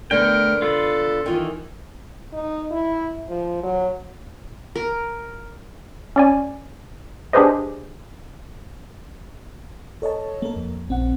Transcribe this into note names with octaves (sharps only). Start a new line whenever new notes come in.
D3 A3 B3 A#4 G5
F4 A4 B4
D#3 E3 F4
D#4
E4
F3
F#3
A#4
C#4 D5 G#5
D4 G4 G#4 B4 C5 D#5
A4 C#5 D#5 A5
A#3 A#4
F2
A#1 C4 F#5